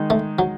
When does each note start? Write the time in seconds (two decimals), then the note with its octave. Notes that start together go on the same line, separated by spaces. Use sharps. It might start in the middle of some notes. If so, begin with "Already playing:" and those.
Already playing: D#3 G#3 D#4
0.10 A3
0.39 F#3